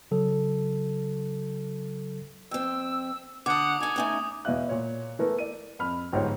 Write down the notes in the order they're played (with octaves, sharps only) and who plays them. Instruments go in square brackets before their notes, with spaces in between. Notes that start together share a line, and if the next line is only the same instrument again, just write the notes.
[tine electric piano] C#3 F#3 A4
[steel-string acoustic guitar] F2 C4 [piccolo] E6
[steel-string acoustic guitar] D3 A5 [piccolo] F#5 [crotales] D6 D#6
[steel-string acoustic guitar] D#4 A4 [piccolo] G#5
[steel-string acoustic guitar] A3 C#4 D#4
[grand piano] E2 B2 E4 D#5 F5 F#6
A#2 C#5 D5
E3 A3 B3 A#4
D5 D#7
F2 B5 F6
G1 G#2 F3 C5 C#5 G5